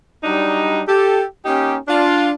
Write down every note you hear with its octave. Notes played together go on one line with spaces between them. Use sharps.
F#3 G3 D4 D#4
G4 A4
A#3 C#4 D#4 G4
D4 F4